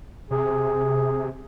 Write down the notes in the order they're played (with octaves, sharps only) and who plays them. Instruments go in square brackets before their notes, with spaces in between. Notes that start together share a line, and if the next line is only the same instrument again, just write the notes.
[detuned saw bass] C3 [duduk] G#4